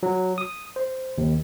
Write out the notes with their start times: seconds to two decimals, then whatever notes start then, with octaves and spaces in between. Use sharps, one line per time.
0.03 F#3
0.38 D#6
0.76 C5
1.18 D#2